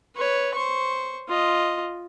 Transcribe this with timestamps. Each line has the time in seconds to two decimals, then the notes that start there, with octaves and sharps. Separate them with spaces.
0.16 B4 C#5
0.55 C5 C#6
1.29 F4 D#5